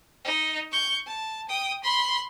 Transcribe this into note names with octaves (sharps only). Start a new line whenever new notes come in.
D#4
C#6 G6
A5
G5 D#6
B5 C6